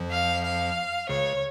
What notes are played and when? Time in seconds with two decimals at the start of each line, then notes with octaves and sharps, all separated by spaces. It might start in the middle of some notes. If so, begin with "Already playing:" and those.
Already playing: F2 F3
0.11 F5
0.44 F5
1.09 C#2 C#3 C#5